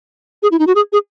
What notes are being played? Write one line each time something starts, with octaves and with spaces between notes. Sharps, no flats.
G#4
E4
D#4
F#4
G#4
G#4